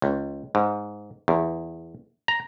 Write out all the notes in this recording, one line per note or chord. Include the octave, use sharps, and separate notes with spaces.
C#2
G#2
E2
A#5